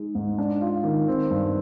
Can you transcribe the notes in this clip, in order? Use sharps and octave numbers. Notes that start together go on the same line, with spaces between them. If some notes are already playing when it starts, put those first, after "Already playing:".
Already playing: G#3 D#4
G#2
D4
F4
D#3
C4
G2